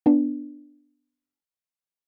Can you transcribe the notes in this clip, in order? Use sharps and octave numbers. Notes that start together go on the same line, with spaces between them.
B3 D4